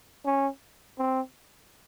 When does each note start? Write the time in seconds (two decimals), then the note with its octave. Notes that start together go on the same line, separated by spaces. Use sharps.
0.26 C#4
0.99 C4